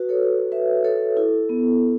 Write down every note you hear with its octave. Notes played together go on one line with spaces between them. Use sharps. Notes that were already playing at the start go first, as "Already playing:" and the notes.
Already playing: F#4 B4
A4 C#5
B4 E5
A4 C#5
E4 A4
B3